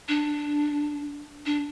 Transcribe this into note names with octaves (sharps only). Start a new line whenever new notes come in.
D4
D4